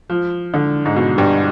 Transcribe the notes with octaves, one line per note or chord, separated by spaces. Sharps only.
F3
D3
G#2
B2
G2